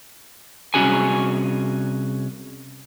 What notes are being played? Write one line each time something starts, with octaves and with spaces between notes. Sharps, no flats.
C2 C3 C#4 F#4 G#4 G#5